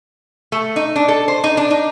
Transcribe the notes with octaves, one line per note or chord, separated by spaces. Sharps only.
A3
D#4
D4
A4
C5
D#4
D4
D#4